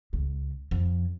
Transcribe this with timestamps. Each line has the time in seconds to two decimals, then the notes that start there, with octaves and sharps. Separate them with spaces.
0.13 C#2
0.71 F2